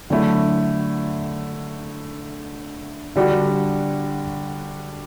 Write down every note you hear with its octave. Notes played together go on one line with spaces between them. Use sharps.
D3 F#3 A3 E4
D3 G3 D4 F#4